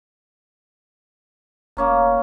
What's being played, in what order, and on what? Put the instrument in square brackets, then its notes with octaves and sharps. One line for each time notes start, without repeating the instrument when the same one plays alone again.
[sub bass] E1 [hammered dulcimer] A#3 C#4 A#5